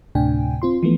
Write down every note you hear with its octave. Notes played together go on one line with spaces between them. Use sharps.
D2 A2 C3 D4 G5 G#5
C4 F4 C6
E3 F3 A3 B3